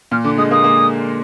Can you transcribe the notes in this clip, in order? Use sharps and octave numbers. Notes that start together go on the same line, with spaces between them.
A#2 F6
D3 D6
G#3 D#6
A#3 D#6
A#3